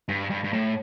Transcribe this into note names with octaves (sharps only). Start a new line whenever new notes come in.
G2
G2
G2
A2